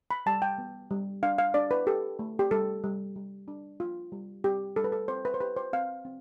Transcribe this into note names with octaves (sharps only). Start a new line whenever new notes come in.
B5
G3 A5
G5
B3
G3
D4 F5
F5
D4 D5
B4
G4 A4
A3
G4
G3 A4
G3
G3
D4
F4
G3
G3 G4
G3 A4
B4
A4
C4 C5
B4
C5
G4 B4
C5
C4 F5
C4